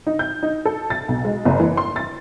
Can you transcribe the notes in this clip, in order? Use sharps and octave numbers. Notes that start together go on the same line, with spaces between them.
D#4
G6
D#4
A4
A6
B1
G#3
F#1
E3
C6
A6